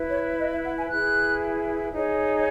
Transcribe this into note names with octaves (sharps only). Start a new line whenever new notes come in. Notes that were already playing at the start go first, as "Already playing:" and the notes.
Already playing: E4 B4
C#5
D#5
E5
F#5
G#5
E4 G#4 B4 F#6
D#4 G#4 C#5